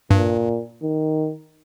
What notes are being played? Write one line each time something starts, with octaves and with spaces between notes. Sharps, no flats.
G2 A#2
D#3